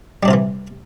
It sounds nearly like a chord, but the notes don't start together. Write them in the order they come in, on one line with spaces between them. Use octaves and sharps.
G3 D4 C3 F4 E3